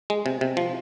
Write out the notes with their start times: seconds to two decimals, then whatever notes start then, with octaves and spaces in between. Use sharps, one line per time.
0.10 G#3
0.26 C3
0.41 C3
0.57 F3